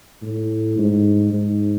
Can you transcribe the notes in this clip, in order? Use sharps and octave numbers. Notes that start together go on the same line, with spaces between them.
A2
G#2
G#2